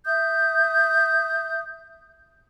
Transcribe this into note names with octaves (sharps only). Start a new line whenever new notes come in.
E5 D#6 G6